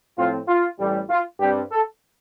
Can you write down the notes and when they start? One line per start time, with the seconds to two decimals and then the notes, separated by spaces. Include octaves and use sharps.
0.17 A2 F3 C4 F4
0.48 F4
0.78 A1 A2 G3
1.09 F4
1.40 G2 G3 C4 G4
1.71 A4